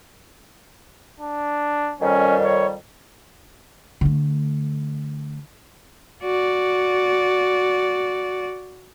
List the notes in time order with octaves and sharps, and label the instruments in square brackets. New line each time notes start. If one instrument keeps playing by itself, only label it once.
[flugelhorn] D4
[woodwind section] F2 D#3 G3 [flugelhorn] C#4
[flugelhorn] C#5
[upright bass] D3 A3
[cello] F#4 D5